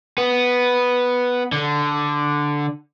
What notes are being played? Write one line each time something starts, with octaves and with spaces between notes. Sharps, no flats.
B3
D3